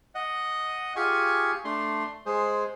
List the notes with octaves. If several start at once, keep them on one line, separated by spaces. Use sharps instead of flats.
D#5 F#5
F4 G4 G#4 G#5 C#6
A3 D4 C6
G#3 G#4 C5